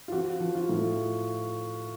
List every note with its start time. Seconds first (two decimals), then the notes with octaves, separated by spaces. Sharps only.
0.08 F4
0.12 F3 F#4
0.40 F3
0.55 F4
0.69 A2